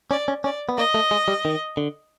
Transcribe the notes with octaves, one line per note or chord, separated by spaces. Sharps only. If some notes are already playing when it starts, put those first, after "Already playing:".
C#4 D5
C#4
C#4 D5
B3
A#3 D#5
A3
G#3
G3
D#3
D3